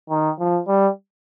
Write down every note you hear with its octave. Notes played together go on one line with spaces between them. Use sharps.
D#3
F3
G3